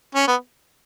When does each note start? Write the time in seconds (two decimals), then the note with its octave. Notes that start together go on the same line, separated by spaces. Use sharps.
0.15 C#4
0.27 B3